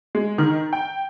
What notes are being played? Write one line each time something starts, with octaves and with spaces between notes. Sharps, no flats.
G#3
D#3
G5